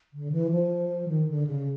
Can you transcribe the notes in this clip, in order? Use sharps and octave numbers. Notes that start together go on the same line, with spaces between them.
D3
E3
F3
D#3
D3
C#3